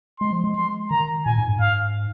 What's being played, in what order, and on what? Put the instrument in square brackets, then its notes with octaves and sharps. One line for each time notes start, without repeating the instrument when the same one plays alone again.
[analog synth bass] G#3 [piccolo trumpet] C6
[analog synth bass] F3
G#3
[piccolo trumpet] C6
[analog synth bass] D#3 [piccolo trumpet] A#5
[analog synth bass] A#2 [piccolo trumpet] G#5
[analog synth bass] G#2
G#2
[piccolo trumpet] F5